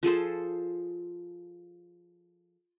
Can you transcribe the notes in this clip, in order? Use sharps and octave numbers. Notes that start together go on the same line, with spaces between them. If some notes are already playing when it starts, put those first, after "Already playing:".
F3 G#4 A4 C5